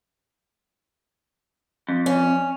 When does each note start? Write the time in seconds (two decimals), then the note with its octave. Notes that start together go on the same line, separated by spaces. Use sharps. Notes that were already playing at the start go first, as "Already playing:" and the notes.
1.89 F2
2.06 C#4